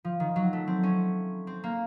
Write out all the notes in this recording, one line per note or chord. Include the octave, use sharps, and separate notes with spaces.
F3
D#3
F#3
A3
C4
C#4
C4
A#3